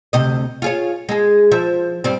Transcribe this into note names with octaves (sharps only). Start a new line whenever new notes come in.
D2 C3 D#5
F4 G#4 C#5
G#3 G#4
F3 E5
G2 G3 C4